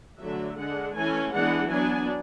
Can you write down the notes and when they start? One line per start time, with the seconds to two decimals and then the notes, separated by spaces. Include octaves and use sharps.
0.21 D3 F#3 A3 E5
0.58 D3 G#3 D4 F#5
0.96 E3 A3 C#4 G#5
1.32 E3 G#3 B3 D4 F#5
1.70 F#3 B3 D4 G#5